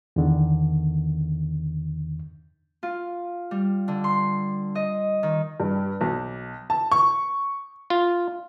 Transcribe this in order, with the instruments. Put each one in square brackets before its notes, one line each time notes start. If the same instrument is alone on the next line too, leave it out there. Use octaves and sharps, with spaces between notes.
[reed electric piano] E2 D3 D#3
[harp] F4
G3
D3
C6
D#5
D#3
[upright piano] G2
B1
A5
C#6
[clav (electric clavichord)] F4